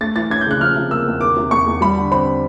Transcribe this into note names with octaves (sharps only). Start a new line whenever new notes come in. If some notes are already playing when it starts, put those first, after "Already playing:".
A3 A6
E3 A6
C#4 G#6
G6
C#3 F#6
F3 F6
C3
A#3 E6
E2
D#3 D6
C3
E2 C#6
E2
G3 B5
D3
C4 B5